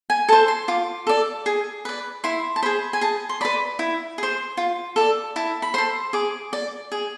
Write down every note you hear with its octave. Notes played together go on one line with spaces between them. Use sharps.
G#5
A4 C5 A5
C6
F4 D6
A4 D5
G#4
B4 D5
E4 C6
A5
G#4 C5 B5
G#5
G#4 A5
C6
B4 D5 B5
E4
G#4 C5
F4
A4 D5
E4 A5
B5
A4 C5 C6
G#4 D6
D5
G#4